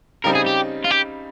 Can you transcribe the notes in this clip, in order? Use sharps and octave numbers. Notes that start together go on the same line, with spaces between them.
C#3 G3 C4 D#4 A#4
G#4
G4
F4
G4